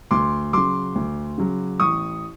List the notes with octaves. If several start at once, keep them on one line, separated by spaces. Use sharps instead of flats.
D2 C6 D6
C#3 F#3 C6 D6
D2
C#3 F#3
A1 C#6 D#6